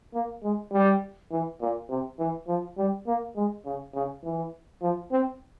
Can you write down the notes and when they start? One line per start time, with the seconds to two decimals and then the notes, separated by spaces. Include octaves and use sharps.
0.14 A#3
0.43 G#3
0.72 G3
1.31 E3
1.61 A#2
1.90 C3
2.19 E3
2.47 F3
2.78 G3
3.07 A#3
3.36 G#3
3.66 C#3
3.94 C#3
4.24 E3
4.82 F3
5.11 C4